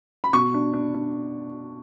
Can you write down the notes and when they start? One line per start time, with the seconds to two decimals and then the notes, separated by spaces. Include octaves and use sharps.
0.24 B5
0.33 B2 C#6
0.54 D4
0.73 D4
0.94 D4